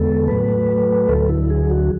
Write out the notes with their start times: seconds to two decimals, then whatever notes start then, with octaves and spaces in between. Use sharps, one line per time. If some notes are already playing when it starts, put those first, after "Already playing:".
Already playing: E2 D3 G#3 B3 A4
0.28 A2 F#3 A3 B4
1.08 D2 D3 F#3 A4
1.29 E4
1.50 G#4
1.70 F#4